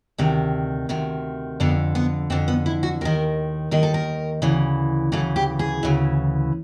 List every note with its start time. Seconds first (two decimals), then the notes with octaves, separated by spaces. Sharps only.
0.18 D2 C3 D#3
0.89 D2 C3 D#3
1.60 F2 D3 B3
1.95 B3
2.30 F2 D3 C4
2.48 B3
2.66 E4
2.83 F#4
3.01 D#2 D#3 A#4
3.71 D#2 D#3 A#4
3.83 A4
3.94 A#4
4.42 D2 C#3 E3
5.12 D2 C#3 E3 A4
5.36 G4
5.59 G#4
5.83 D2 C#3 E3